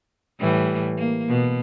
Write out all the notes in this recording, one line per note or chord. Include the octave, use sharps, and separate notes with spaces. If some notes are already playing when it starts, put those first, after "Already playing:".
A2 E3 G3
A#3
B2